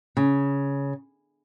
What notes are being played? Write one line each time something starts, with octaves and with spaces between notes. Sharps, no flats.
C#3